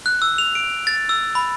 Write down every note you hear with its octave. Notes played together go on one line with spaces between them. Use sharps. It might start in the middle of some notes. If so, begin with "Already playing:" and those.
F#6
E6
F7
D7
A6
E6
B5